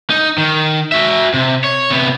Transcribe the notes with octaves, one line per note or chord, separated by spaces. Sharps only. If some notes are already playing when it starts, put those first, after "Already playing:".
D#4
D#3
F#4 E5
C3
C#5
C3 B3